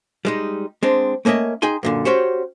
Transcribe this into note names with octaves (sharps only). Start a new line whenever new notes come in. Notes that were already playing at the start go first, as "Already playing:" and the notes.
G3 G#3 D#4
G#3 C4 D4
A3 A#3 C#4 D#5 E5
D#4 G#4 G5 G#5 C6
F#2 A#2 D3
C#4 F#4 G4 C5 C#5